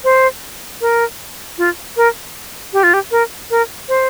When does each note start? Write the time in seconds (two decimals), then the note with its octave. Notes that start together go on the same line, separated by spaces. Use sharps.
0.04 C5
0.81 A#4
1.58 F4
1.97 A#4
2.73 G4
2.83 F4
2.94 G4
3.11 A#4
3.50 A#4
3.89 C5